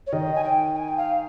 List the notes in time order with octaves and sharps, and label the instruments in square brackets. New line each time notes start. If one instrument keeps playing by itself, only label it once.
[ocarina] C#5
[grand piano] D#3 [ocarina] D#5
[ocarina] G#5
G5
G#5
G5
F5